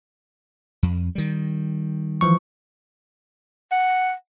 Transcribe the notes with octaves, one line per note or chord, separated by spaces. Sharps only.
F2
D#3 G3
E3 F3 C#6
F#5